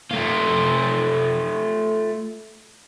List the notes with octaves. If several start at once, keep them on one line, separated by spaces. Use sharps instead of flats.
A3 F4